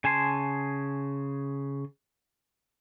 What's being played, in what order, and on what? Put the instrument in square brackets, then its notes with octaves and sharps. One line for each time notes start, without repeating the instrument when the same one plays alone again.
[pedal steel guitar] C#3 G#5 A5 C6